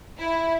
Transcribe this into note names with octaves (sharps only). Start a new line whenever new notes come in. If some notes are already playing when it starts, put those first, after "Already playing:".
E4